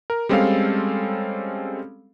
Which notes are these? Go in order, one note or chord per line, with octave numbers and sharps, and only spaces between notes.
A#4
G3 G#3 C4 C#4 A4 F5